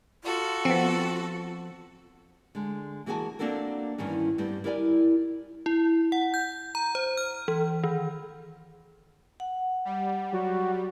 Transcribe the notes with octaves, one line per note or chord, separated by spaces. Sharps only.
F4 F#4 A4
F3 B3 C4
D3 G#3
E3 A#3 F#4 G#4 G#5 A5
A#3 C4 D4 F#4 A4 A#4
E2 G2 D#3 E3 C#4
G2 G3 B3 C4
E4 G4 A#4 D5 F5 G#5
E4
F#5
G6
A#5
C5
F6
E3
D#3
F#5
G3
F#3 F#4